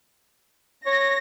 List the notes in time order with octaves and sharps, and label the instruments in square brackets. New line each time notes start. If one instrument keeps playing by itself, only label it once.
[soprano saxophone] C#5 [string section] A#6